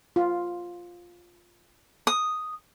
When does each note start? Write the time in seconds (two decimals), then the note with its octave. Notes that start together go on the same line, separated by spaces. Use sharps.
0.16 F4
2.07 D#6